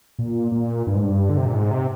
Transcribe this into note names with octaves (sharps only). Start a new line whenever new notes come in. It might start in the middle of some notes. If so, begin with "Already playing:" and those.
A#2
A#2
G2
G#2
G2
D3
C3
A#2
G#2
C3